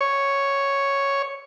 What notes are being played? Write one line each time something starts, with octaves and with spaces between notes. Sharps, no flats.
C#5